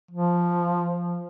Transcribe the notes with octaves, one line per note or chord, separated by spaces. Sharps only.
F3